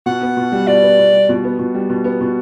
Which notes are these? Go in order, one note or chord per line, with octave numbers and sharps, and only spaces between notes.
B2 F#5
B3
B2
G3
B2 D5
B3
B2
G3
B2
B3
B2
G3
B2
B3
B2